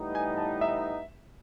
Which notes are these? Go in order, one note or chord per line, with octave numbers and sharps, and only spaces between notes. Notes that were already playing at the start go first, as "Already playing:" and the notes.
Already playing: A2 E3 G3 B3 D#4
G#5
A5
E5